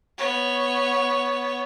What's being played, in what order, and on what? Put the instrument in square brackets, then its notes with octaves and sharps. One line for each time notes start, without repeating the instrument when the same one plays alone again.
[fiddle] B3 C#5